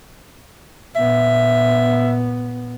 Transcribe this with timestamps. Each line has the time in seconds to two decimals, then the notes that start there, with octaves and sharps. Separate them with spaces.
0.96 A#2 B3 E5